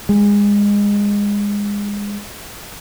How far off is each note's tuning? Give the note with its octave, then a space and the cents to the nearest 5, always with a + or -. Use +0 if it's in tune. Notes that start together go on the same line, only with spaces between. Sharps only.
G#3 -25